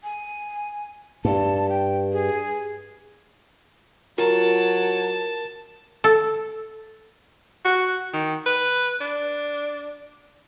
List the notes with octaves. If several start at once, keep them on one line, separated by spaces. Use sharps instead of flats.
G#5
G2 A5
G5
G#4
F#3 F4 A#4 A5
A4
F#4
D#3
B4
D4